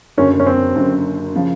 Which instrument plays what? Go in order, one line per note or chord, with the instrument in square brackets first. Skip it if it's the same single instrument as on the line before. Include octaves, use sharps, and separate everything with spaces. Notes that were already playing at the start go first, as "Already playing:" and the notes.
[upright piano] F#1 F#2 D3 [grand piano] C#4
[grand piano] C#4
C4
[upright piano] F#1 F#2 D3
C#3 F3